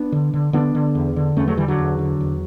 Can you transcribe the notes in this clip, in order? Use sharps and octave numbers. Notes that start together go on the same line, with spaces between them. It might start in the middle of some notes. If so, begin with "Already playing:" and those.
Already playing: B3 D4
D3
D3
D3 B3 D4
D3
E2
D3
E2 A3 C#4
F#3 A3
D3 E3 G3
D3 F#3
E2
D3
E2